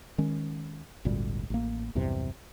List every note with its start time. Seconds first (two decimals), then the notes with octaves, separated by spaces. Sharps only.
0.18 D#3 G#3 C#4
1.05 G#1 D2 A#2 G3
1.50 A1 A#3
1.95 B1 E2 G2 C3